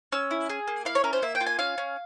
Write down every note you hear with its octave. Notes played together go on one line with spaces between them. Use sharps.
C#4 E6
E4
G#4
A#3
E4 F5
C#5
C#4 A#4
C5
A#3 E5
G5
F4
G#5
C#4 F5
C#4